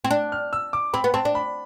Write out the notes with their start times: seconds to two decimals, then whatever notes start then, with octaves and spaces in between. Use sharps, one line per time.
0.04 C4
0.11 D4
0.32 F6
0.53 E6
0.73 D6
0.93 C4 B5
1.04 B3
1.14 C4 A5
1.25 D4
1.35 B5